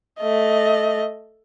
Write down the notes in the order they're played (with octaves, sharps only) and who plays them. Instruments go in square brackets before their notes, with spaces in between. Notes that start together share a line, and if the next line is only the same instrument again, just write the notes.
[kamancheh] A3 D#5